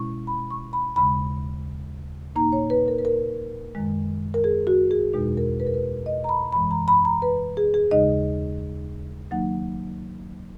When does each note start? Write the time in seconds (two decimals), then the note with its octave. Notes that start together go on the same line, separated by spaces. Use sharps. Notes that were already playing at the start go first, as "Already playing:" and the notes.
Already playing: B2 G#3 C#4 E4 C#6
0.27 B5
0.51 C#6
0.73 B5
0.96 D#2 C#3 G#3 B5
2.35 A#2 A#3 D#4 A#5
2.52 C#5
2.70 B4
2.88 A#4
2.98 B4
3.05 A#4
3.75 F#2 D#3 G#3
4.34 A#4
4.44 G#4
4.67 F#4
4.91 G#4
5.13 E2 B2 G#3 D#4
5.37 A#4
5.60 B4
5.67 A#4
5.74 B4
6.06 D#5
6.24 A#5
6.29 B5
6.52 F#2 E3 G#3 B5
6.71 A#5
6.88 B5
7.05 A#5
7.22 B4
7.57 G#4
7.74 G#4
7.91 D#2 C#3 G#3 D#4 D#5
9.31 D#3 F#3 A#3 D#4 F#5